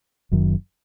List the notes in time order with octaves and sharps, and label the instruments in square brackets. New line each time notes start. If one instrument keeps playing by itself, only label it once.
[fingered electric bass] F#1 F#2 D#3